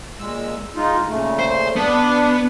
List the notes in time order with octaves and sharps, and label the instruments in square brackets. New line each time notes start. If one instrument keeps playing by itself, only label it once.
[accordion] A#2 G#3 E6
G#3 D#4 F4
A#2 C#3 A3
[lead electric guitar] C5
[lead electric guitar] B3 [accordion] D4